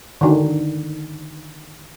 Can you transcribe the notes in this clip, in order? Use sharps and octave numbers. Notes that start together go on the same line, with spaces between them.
D3 D#3